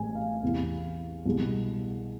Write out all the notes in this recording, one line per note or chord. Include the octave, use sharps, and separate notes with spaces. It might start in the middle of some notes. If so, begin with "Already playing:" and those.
Already playing: A1 A2 G#3 G#5
F5
E2 C3 E3
C2 B2 G#3